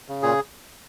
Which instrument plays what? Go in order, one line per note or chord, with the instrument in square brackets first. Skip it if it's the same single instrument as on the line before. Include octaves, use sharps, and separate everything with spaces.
[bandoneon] C#3
A#2 G#4